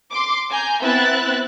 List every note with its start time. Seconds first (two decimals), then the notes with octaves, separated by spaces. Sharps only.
0.11 C6 D6
0.50 G#5 A#5 G6
0.82 B3 C4 E4 E5 F#6 A6